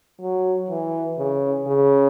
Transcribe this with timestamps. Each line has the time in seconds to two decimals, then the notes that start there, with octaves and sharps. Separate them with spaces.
0.21 F#3
0.70 E3
1.18 C#3
1.67 C#3